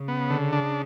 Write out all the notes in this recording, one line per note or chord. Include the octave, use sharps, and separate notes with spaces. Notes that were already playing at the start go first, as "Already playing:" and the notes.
Already playing: C#3
B3
D3
D4